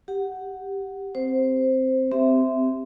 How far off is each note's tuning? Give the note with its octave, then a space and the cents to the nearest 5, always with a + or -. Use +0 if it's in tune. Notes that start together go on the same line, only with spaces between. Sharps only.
G4 +0 F#5 +0
C4 +0 C5 +0
C4 -15 G4 +0 E5 +0